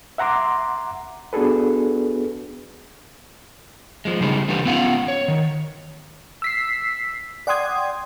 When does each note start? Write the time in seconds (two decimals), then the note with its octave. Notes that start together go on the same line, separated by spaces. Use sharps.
0.18 E5 F#5 A#5 C6 D6
1.33 B3 D4 F#4 G#4 A4 B4
4.05 F3 G#3
4.21 C#3 G3 D#4 G#4
4.48 D3 E3 G4 B4
4.65 B3 C#4 F4 F5 F#5
5.08 C#5
5.28 D#3
6.42 E6 B6 C7
7.47 D5 F#5 G5 C6 D#6 G#6